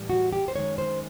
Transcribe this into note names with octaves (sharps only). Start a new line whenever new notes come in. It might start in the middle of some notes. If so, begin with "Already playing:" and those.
Already playing: A2 E3 G3
F#4
G4
C5
F#2 D#3 G#3 C#5
C5